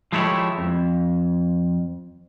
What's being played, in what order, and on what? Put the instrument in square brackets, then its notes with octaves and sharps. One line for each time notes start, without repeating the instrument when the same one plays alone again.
[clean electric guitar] F3 G#3 A3 E4 G4 C#5
F2